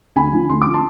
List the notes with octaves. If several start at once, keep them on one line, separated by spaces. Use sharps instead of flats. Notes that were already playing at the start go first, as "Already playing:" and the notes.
D2 G#5 B5
D3 F3
D2 C6
D3 F3 D6
A5 C6